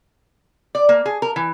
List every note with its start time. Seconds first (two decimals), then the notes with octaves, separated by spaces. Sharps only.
0.75 D5
0.89 A#3
1.06 G#4
1.22 A#4
1.36 E3